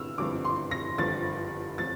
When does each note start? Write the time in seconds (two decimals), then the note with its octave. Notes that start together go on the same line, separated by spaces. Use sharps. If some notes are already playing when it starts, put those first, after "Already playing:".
Already playing: G1 G2 E6 F6
0.18 G1 G2 F3 D6
0.45 C6
0.71 A#6
0.98 G1 G2 F3 A6
1.78 F3 A6